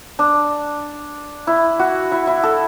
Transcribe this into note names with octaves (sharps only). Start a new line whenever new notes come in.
D4
E4
F#4
E4
E4
A4